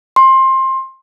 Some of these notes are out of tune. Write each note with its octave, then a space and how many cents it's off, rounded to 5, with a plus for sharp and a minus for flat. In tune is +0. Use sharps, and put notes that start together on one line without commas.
C6 +20